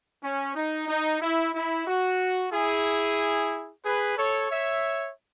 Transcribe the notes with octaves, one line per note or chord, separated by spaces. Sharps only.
C#4
D#4
D#4
E4
E4
F#4
E4 G#4
G#4 B4
A4 C#5
C#5 E5